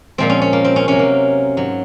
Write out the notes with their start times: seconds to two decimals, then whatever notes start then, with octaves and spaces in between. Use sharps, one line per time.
0.18 A#2 F3 G#3 C4
0.30 C#4
0.41 C#4
0.53 A#3
0.65 C4
0.76 C#4
0.88 C3 F#3 C#4
0.99 A#3
1.57 G#2 F#3